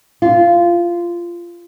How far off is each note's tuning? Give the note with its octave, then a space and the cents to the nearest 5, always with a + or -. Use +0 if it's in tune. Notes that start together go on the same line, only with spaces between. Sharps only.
F4 -15